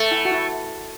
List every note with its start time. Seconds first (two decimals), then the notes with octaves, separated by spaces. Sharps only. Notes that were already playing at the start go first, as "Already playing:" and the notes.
Already playing: A3
0.11 E4
0.25 F#4
0.32 E4